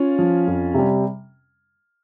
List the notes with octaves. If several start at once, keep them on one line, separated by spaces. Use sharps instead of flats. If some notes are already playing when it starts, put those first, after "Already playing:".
Already playing: C#4 F4
F3
F2
C3 G3